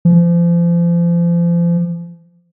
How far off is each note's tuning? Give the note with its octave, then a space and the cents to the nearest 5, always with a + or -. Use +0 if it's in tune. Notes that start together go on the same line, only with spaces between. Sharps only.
F3 -35